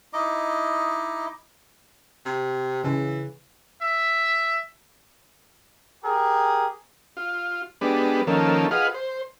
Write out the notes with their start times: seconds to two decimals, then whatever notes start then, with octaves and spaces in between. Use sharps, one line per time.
0.13 D#4 E4 D#5 D6
2.26 C3
2.84 C#3 E3
3.82 E5
6.04 G4 G#4 A#4
7.17 F4
7.81 G3 G#3 B3 D4 B4
8.27 D#3 F3 A#3 C#4 A4
8.71 F4 G#4 B4 D#5 F5 F#5
8.94 C5